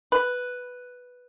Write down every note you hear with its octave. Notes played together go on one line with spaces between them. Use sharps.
B4